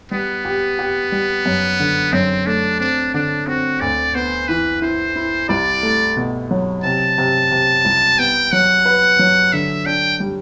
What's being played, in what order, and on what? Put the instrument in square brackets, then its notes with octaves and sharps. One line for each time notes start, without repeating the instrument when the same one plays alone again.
[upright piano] G3 [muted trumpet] B3
[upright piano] G4
G4
G3
F#2
D3
[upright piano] F#2 [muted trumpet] C4
[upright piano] A3 [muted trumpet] D4
[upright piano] C4 [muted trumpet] D4
[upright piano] D3 [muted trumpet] D4
[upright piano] C4 [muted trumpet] F#4
[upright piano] D2 [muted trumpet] D5
[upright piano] B3 [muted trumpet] C5
[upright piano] E3 [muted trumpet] B4
[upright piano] E4 [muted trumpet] C5
[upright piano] E4
[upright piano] C2 [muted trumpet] D5
[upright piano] A3
B2
F#3
[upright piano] C3 [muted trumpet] A5
[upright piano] C3
C3
C2
[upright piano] B3 [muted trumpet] G5
[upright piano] F#3 [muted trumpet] F#5
[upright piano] B4
F#3
[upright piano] D3 [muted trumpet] E5
[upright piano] D4 [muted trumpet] G5
[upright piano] G3